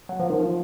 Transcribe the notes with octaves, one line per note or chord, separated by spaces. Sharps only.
F#3
F3
D#3
F3